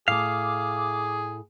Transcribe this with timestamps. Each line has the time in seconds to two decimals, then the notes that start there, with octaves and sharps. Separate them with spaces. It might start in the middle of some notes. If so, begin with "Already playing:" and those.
0.08 A2 G#4 F5 A5 D6